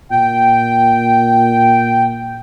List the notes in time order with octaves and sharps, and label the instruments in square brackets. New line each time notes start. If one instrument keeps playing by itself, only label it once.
[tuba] A#2 [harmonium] G5